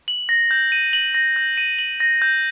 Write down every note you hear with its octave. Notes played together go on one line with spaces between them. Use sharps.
F#7
A#6
G6
D#7
F#7
A#6
G6
D#7
F#7
A#6
G6